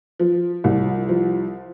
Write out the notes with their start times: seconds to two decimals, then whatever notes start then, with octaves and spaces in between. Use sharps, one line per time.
0.19 F3
0.64 C2
1.09 F3